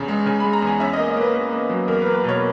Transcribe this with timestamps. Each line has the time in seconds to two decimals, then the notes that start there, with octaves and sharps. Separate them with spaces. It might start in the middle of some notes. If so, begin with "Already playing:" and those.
Already playing: E2 C#3
0.08 G#3
0.26 C#3 G#5
0.40 G#3 B5
0.53 A#5
0.62 E2 G#5
0.80 C#4 E5
0.93 A#3 D#5
1.08 D#5
1.17 A#3 B4
1.34 A#3
1.53 A#3
1.70 F#3
1.88 E2 A#4
2.02 B4
2.06 A#3
2.14 B4
2.24 B2 C#5